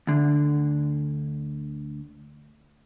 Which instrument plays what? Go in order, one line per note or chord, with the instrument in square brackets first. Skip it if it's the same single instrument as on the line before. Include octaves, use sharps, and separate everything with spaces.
[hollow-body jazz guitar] D2 D3